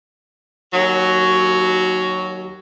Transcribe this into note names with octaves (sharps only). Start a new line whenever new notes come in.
D#2 F#3